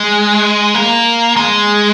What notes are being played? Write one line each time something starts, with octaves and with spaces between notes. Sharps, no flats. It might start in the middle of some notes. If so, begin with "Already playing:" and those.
Already playing: G#3
A#3
G#3